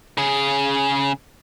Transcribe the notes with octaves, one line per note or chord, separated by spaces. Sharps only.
C#3 G#4